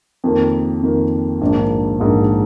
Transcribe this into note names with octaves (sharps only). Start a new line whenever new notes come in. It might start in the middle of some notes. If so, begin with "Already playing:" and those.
F2 D#3 A#3
F2 D#3 A#3
A#1 G#2 D#3 A#3 D4
A#1 G#2 D#3 A#3 D4